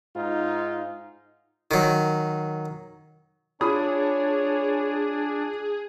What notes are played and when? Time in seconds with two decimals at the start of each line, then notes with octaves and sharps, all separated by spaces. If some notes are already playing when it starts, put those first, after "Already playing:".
0.16 G#2 D#4 F4
1.71 D#3 F#3
3.61 D4 F4 G#4 C#5 B5 D#6